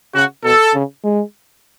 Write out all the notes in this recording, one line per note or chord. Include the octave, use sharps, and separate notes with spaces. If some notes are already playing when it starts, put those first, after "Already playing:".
C#3 F#4
B2 A4
C#3
G#3